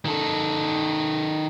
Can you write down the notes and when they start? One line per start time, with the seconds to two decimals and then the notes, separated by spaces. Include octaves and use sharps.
0.05 D#3 A4